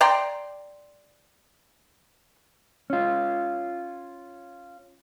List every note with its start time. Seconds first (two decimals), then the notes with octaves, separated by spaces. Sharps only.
0.01 D5 G5 A#5 C6
2.90 C#4 F4